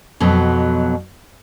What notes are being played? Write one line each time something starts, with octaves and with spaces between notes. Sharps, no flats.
F2 B2 F#3